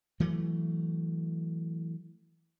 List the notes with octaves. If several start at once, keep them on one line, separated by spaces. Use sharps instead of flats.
E3 F#3 A3